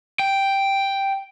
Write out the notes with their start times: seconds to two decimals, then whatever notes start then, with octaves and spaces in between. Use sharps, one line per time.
0.20 G5